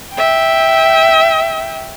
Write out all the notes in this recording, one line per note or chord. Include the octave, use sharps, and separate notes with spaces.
E5 G5